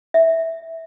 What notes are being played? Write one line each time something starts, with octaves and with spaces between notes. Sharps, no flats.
E5